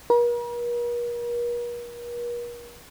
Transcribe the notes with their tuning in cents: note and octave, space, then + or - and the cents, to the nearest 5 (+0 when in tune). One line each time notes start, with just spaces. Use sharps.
A#4 +45